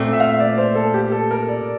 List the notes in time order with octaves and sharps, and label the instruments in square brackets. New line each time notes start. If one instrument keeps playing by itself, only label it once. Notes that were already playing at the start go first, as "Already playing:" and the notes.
Already playing: [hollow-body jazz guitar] A#2 A3 C4
[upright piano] E5
F5
E5
D5
C5
A4
G4
A4
A#4
D5